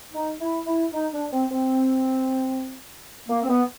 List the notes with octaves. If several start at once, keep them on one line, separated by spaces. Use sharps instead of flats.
D#4
E4
E4
D#4
D4
C4
C4
A#3
C4
B3